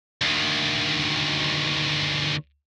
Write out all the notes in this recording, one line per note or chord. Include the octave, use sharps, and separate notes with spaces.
D2 D#3